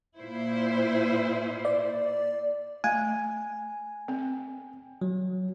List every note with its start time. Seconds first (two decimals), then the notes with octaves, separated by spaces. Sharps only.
0.18 A#2 E4 C5
1.65 D5
2.84 A3 G#5
4.08 C4
5.02 F#3